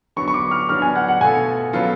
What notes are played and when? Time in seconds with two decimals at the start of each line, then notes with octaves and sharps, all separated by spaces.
0.16 D3 F#3 B3 C#6
0.28 C#6
0.34 D6
0.51 F6
0.69 D3 F#3 B3 D4 F6
0.82 G#5
0.95 F#5
1.08 F#5
1.21 B2 A3 F4 A4 G#5
1.73 C#3 F#3 B3 F4 A4